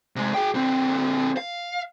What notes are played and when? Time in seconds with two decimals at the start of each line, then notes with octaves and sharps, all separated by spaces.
0.16 C3 G#3
0.34 G#4 G5
0.54 D3 C4
1.37 F5